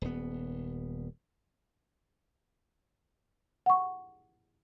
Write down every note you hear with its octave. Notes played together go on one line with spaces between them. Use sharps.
D#1 B3
F#5 C#6